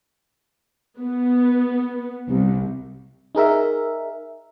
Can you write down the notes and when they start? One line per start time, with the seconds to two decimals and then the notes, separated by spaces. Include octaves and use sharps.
1.00 B3
2.28 C2
3.35 D#4 G#4 A#4 E5